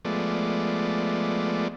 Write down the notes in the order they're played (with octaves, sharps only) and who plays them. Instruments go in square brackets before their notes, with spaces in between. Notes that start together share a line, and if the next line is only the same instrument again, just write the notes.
[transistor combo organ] F3 G#3 A3 B3 D5